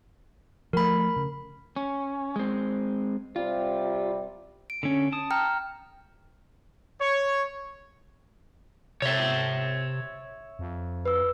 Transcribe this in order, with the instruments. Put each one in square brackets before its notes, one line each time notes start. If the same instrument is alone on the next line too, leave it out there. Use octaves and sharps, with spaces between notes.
[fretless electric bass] F3 A3 [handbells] A#4 B5
[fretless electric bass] C#3
[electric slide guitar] C#4
G#3 C4
[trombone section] C3 G3 [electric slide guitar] F4
[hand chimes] D7
[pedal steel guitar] D3 C#4
A5 D#6
[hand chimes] G5 A#5 F6
[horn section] C#5
[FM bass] C3 [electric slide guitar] C#5 E5
[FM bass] F2
[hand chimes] B4 E6